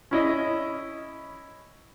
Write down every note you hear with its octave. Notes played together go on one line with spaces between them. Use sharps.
C#4 E4 D#5